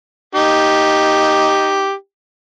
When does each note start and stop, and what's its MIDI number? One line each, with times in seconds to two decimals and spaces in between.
0.35 1.94 63
0.35 1.94 67